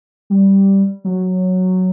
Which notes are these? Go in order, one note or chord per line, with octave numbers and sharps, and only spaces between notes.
G3
F#3